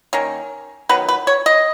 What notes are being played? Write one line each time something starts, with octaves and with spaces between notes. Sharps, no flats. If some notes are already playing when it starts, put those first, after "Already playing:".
D#3 A#3 C#4
D#3 F#3 B3 B4
B4
C#5
D#5